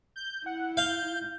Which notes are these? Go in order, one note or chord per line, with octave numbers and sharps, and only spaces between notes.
G6
E4 F#5
F5 G6